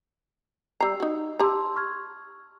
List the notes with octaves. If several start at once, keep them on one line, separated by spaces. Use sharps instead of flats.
G3 A#5 E6 C7
D#4 F#4
G4 A5 A#5 C6 E6
C#6 F6 G#6